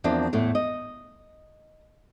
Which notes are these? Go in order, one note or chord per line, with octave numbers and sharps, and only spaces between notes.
E2 F3 A#3 C4 D4
E2 A2 A3
D#5